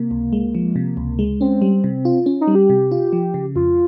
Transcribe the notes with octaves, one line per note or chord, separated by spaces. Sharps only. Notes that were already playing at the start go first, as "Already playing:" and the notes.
Already playing: C3 A#3
C#2
G#3
F3
C3
C#2
G#3
C4 C#4
G3
C3
F4
C#4
D#4
G3
G4
C3
F4
F3
C#3
F2 F4